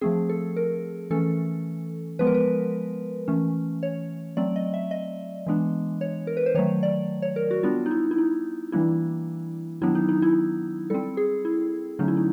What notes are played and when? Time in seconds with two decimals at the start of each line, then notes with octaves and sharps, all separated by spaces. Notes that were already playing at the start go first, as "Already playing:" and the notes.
0.01 F3 A3 C4 G#4
0.29 A4
0.56 A#4
1.10 E3 A3 C#4 A4
2.19 F3 G#3 B3 B4
2.27 A#4
2.34 B4
3.28 E3 A3 C#4
3.83 C#5
4.37 F#3 A3 C4 D5
4.56 D#5
4.74 E5
4.91 D#5
5.47 E3 G#3 B3 D4
6.01 C#5
6.27 A#4
6.37 B4
6.46 C5
6.54 D#3 F#3 A3 C#5
6.83 D5
7.22 C#5
7.36 A#4
7.51 F#4
7.63 G3 B3 D4 F4
7.86 D#4
7.91 E4
8.11 E4
8.18 D#4
8.72 E3 G3 A#3 D4 E4
9.81 D#3 F#3 B3 D4 E4
9.95 D#4
10.09 D#4
10.22 E4
10.90 G3 C4 A4
11.17 G#4
11.45 E4
11.99 D3 F#3 A3 C#4 D#4
12.08 E4
12.17 D#4